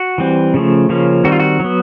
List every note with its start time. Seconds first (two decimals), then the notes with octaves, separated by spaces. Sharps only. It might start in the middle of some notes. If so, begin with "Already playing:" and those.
Already playing: F#4
0.18 E3 G3 C4
0.54 C#3 F3 A3
0.89 C#3 F3 A#3 C#4
1.24 D#3 G3 C4 F#4
1.32 F4
1.40 F#4
1.60 F#3 B3